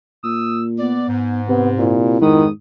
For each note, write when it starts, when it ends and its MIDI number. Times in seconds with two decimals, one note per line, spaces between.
0.24 1.03 46
0.24 0.61 87
0.24 0.61 88
0.79 1.40 59
0.79 1.06 74
1.08 2.03 44
1.48 2.20 48
1.48 1.70 59
1.78 2.19 46
1.78 2.43 64
2.21 2.49 41
2.21 2.50 44
2.21 2.46 51
2.21 2.49 59
2.21 2.49 87